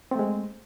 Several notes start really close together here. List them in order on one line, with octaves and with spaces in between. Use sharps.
C4 A3 G#3